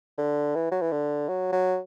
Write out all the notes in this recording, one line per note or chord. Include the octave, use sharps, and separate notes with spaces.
D3
E3
F#3
E3
D3
F#3
F#3